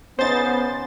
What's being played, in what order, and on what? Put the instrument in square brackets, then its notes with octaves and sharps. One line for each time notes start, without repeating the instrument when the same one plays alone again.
[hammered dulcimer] C#3 D#4 [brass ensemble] B3 [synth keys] C5 A6